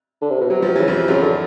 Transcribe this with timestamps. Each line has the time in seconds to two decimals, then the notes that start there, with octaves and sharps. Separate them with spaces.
0.22 D3
0.30 C3
0.41 B2
0.50 C3 F#3
0.61 B2 F3
0.69 C3
0.76 C#3 E3
0.88 F2 B2 F3
0.98 C3
1.08 F#2 C#3 F#3
1.22 D3